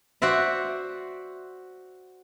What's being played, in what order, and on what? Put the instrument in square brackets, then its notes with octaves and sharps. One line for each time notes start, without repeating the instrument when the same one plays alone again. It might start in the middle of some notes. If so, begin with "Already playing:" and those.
[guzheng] F#4 C5 D5 E5